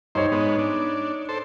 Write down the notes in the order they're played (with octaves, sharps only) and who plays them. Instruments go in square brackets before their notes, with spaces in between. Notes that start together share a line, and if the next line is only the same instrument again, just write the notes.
[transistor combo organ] G2 C5 [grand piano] D#4 C#5 D#5
[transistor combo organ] G#2 B3
D4
A4 C5